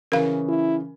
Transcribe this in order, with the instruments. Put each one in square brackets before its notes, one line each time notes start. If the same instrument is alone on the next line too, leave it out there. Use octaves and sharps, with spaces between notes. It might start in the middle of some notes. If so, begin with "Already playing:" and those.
[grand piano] C#3 E3 C#4 [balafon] A#4 F5
[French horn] E4